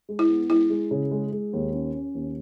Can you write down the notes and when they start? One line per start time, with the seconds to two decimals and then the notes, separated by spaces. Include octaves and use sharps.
0.09 G#3
0.19 E4
0.29 B3
0.50 G#3 E4
0.70 G#3
0.91 C#3
1.11 G#3
1.32 G#3
1.53 D#2
1.73 C#4
1.94 C#4
2.15 D#2